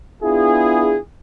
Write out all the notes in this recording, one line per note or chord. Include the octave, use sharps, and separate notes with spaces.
B3 D4 E4 F4 G#4